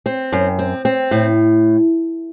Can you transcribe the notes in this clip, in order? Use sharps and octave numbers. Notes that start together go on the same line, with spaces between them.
C4
F#2
C4
C4
A2